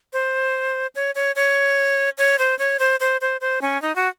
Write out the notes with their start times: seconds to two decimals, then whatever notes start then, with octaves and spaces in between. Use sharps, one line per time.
0.13 C5
0.95 C#5
1.15 C#5
1.36 C#5
2.18 C#5
2.39 C5
2.59 C#5
2.79 C5
3.00 C5
3.21 C5
3.41 C5
3.62 C#4
3.82 D#4
3.96 F#4